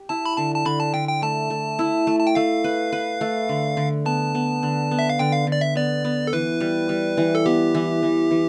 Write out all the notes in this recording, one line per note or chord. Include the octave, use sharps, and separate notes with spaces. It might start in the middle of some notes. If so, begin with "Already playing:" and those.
Already playing: G4
E4 A5
B5
D3 A5
A5
D3 B5
A5
D3 G5
G5
A3 A5
A3
E4
A3
A5
G5
A3 F5
B4
B4
A3
D3
D3
B3 A5
B3
D3
B3
E5
F5
D3 G5
F5
D3
D5
E5
B3 D5
B3
A4
E3 B4
G3
G3
E3
A4
B3 G4
E3
E3
E3